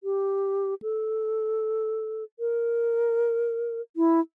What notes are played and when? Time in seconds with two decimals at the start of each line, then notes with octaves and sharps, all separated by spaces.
0.04 G4
0.82 A4
2.40 A#4
3.97 E4